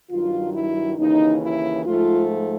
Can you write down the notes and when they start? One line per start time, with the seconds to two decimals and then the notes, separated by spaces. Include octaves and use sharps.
0.10 G2 D#3 F#3 F4
0.54 E4
0.98 D#2 C#3 E3 D#4
1.42 E4
1.85 G#2 F3 A3 F4